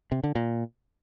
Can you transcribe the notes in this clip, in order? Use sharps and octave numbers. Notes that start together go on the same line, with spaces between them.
C3
D3
A#2